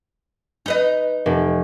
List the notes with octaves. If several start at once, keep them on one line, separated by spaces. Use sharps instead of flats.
D#4 B4 D#5
F1